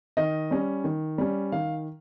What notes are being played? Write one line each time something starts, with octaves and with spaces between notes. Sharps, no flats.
D#3 D#5
G3 C#4
D#3
G3 C#4
D#3 F5